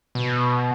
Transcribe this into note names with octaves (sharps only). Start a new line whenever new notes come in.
B2